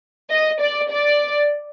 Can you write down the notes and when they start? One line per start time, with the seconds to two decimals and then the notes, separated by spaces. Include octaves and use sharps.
0.30 D#5
0.60 D5
0.90 D5